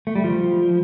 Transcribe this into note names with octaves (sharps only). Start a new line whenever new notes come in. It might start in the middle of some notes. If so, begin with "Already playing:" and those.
A3
G3
F3